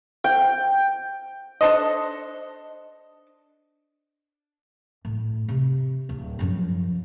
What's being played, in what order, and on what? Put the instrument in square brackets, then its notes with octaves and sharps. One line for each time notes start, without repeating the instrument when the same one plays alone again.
[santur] G5
[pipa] D4 A4 C5 D#5
[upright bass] A2
C3
D1
F#2 F3